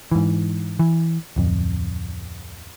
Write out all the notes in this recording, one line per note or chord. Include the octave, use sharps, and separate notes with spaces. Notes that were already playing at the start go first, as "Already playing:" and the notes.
G#2 E3
E3
D1 F2